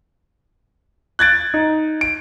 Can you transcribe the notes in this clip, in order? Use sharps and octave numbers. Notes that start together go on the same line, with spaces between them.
F#6 G#6 A6 D7
D#4
D7